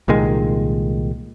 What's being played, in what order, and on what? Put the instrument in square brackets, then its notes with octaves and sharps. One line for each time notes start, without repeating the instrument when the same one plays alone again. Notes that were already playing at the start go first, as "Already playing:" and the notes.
[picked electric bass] C2 A#2 D#3 G#3